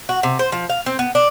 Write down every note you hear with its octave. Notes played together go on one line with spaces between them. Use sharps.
F#4
C3
C5
F3
F5
C4
B3
D4